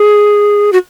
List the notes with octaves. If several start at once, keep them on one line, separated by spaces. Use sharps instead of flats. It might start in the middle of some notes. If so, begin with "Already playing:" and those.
Already playing: G#4
F#4